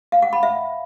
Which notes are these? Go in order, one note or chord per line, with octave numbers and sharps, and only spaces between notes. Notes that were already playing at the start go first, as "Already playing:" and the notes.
F5
F#5
B5
E5